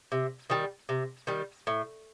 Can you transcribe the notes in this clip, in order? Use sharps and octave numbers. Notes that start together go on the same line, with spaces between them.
C3
D#3 G3
C3
D#3 G3
A2